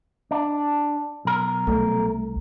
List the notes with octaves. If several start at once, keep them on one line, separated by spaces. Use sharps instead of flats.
D4
B1 A#4
C2 A3